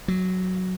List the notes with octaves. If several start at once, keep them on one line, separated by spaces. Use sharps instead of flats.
F#3